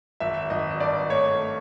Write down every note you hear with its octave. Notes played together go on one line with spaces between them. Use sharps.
G#1 E5
G#1 D#5
D#5
G2 D5
A3 C#5
A3